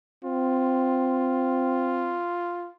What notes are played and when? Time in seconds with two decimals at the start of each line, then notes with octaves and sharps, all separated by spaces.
0.25 C4 F4